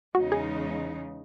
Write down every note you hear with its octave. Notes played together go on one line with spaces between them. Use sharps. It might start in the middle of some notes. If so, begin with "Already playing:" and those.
E2 C#3 G#3 D#4 F#4
G#4